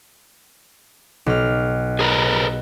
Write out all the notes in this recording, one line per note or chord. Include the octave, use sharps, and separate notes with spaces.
B1 F6
G#4 A#4 B4